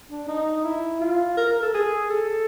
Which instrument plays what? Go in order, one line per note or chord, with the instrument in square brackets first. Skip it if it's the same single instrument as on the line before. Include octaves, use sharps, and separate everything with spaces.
[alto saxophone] D4
D#4
E4
F4
A#4
A#4
A4
G#4
A4